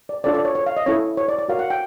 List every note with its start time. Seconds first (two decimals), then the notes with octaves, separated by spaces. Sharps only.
0.09 D5
0.24 D4 F4 A4 C#5 D5
0.34 D5
0.45 C#5
0.55 C#5
0.66 F5
0.77 D#5
0.86 C#4 E4 A4 C#5
1.17 C#5
1.28 D5
1.39 D5
1.49 F#4 A#4 C#5 F5
1.59 F#5
1.70 G5